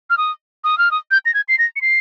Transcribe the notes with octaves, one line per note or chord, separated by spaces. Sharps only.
F6
D#6
D#6
F6
D#6
G6
A#6
G#6
C7
A#6
C#7
C7